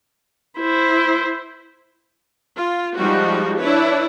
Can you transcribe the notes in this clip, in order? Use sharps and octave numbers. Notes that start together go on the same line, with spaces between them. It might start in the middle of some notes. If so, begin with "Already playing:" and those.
E4 C5
F4
F3 G3 G#3 D#4 F#4
D4 E4 B4 C#5